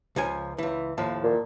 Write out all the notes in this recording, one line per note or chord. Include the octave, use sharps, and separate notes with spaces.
C#2 F3 G#5
C#2 E3
D#2 A2 F3
A#2